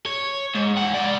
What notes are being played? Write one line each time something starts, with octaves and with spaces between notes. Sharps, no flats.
C#5
G#2
E3 F#5
G#3 D5